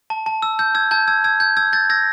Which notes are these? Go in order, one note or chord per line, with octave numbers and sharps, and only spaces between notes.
A5
A5
E6
E6 G6
E6 G#6
A5 G6
E6 G#6
E6 G#6
G6
E6 G#6
G6 A6
E6 G#6 A#6